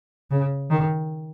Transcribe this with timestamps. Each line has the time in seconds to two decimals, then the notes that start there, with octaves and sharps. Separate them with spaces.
0.31 C#3
0.71 D#3